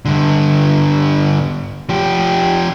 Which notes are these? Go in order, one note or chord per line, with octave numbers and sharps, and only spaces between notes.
G2 D3
F3 G4